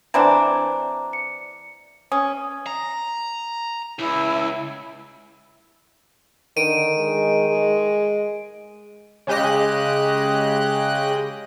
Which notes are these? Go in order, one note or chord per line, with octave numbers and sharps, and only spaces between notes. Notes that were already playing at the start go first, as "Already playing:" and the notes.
E3 C4 D4 A#5
C#7
C#4 D#6
A#5
C#2 E4
D3 D#3 D7 D#7
G#3
G#3
C#3 G#3 G4 D#5 F#6